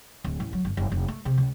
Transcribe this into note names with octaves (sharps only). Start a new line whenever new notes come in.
D1
A1
F#3
G1
F#1
F1
A3
C3
C#2